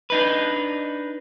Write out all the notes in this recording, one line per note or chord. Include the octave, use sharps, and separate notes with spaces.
D4 D#4 B4